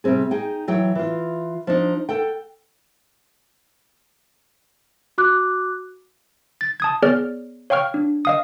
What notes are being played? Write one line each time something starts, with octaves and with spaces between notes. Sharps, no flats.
C3 G3 C4 G#4
D#4 G#4 G5
E3 F#3 G5
E3 F4
F3 D4 D#4
A4 F#5 G5
F#4 D6 F#6
A6
A5 D#6 G#6
B3 G#4 C#5 D5 F6
C#5 F5 G5 C#6 F6
D4
D#5 F5 D#6